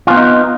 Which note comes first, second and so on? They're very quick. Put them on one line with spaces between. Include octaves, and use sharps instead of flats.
F4 B3 C4 D#4